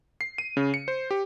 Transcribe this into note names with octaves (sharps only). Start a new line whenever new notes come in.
C7
D#7
C#3
C#7
C5
G4